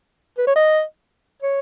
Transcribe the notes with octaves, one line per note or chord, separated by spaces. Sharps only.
B4
C#5
D#5
C#5